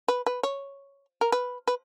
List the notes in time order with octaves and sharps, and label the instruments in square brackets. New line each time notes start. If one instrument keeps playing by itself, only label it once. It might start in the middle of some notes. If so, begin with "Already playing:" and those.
[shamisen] B4
B4
C#5
A#4
B4
B4